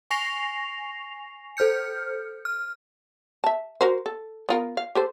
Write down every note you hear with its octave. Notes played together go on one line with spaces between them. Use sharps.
G#5 C#6 A#6 C7 F7
A4 C5 F6 G6 C#7
F6
E5 A5
F#4 A#4 C5
A4
B3 F4 A#4
F5
G4 A4 C5